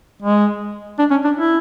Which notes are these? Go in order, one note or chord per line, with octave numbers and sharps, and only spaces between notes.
G#3
D4
C#4
D4
E4